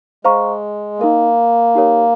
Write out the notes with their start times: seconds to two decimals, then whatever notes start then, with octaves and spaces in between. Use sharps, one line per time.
0.25 G#3 C5 F5 A#5 C#6
0.99 A#3 D#4 A#4 D#5
1.75 D#4 G4 A#4 C#5